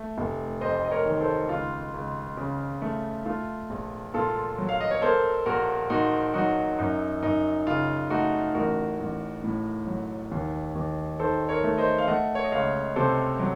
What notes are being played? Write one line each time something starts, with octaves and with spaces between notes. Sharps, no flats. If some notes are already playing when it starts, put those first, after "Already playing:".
Already playing: A3
F1
F2 C5 D#5
D#5
A#4 C#5
D#3
A4 C5
C#2 F4
C#2
C#3
A3
A3 F4
A#1
A#2 F4 A4
F#3
F5
D#5
C#5
A#3 A4 C5
A#1 F#4 A#4
A#2 D#4 F#4
F#3 D#4 F#4
F#2 D#4
F#2 D#4
C#3 F4
A3 D#4 F#4
A1 F#4 A#4
A1
A2
F#3
D#2
D#2
D#3 A4 C5
A#4 C#5
A3
C5 D#5
F5
A3 D#5 F#5
C#5
D#5
C#2 C#5 F5
C3 A4 C5
F#3